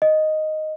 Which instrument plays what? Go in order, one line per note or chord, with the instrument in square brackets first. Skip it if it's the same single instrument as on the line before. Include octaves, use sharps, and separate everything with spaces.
[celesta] D#5